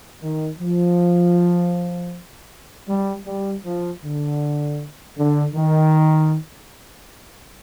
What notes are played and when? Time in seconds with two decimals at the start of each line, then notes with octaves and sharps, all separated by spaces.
0.22 D#3
0.60 F3
2.88 G3
3.27 G3
3.65 F3
4.03 D3
5.17 D3
5.55 D#3